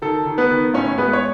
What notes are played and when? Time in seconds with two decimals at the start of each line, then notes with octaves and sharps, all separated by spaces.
0.02 D#3 A4
0.26 D#3
0.38 B3 B4
0.51 D#3
0.74 A2 C#4 C#5
0.98 G#3 B3 B4
1.13 C#5